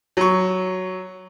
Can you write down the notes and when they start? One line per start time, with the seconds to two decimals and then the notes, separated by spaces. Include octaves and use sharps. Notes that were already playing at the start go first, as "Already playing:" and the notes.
0.17 F#3 C#6